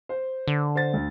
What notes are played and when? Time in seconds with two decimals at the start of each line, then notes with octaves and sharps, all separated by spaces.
0.09 C5
0.48 D3
0.75 C5 A6
0.93 D2